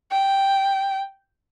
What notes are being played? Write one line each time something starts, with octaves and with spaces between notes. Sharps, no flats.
G5